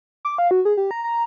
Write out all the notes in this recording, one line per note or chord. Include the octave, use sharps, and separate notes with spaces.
D6
F5
F#4
G#4
G4
A#5
A#5